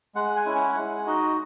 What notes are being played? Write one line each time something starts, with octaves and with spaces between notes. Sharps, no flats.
G#3 F#5
G#5
C#4 E4
F#5
G#3 F#5
D#4 F#4 D#5